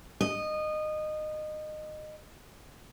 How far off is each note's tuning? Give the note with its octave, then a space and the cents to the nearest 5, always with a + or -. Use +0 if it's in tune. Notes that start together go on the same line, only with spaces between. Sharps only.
D#5 -20